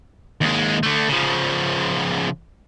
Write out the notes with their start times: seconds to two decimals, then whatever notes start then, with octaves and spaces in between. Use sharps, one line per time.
0.41 D#2 G#3
0.83 D3 A3
1.08 C#3 F3